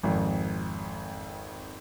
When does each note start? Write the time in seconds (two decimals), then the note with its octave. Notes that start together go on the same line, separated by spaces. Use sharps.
0.03 G#1 F2